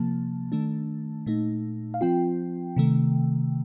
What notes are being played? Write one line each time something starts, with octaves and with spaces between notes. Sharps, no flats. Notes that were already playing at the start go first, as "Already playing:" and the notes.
Already playing: C3 F3 A#3 A5
D#3 A3 D4
A#2 A3 D#4
F5
F3 C4 F4 G5
C3 D#3 A3